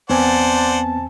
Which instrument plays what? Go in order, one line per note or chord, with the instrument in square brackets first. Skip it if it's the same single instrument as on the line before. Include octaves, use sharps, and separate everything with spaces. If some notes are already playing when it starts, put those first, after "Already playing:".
[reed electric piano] E2 C4 G#5 [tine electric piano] B3 [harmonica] C5 D5 F#5 [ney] A5